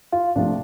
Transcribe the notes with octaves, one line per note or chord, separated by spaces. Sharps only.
F4
C2 C3 F3 A3 D4